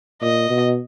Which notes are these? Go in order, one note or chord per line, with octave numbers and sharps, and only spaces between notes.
A#2 D#5
B2